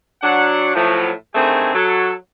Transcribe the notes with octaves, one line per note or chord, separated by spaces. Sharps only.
F#3 D4 F#5
A2 F3 F#3
D3 D#3 A3 C4 G#4
F#3 A4